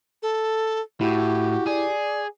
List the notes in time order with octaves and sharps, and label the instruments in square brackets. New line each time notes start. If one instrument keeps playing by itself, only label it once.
[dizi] A4
[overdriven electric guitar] A2 [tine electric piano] E4 [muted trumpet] F#4 [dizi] G4
[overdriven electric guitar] G#4 [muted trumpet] D5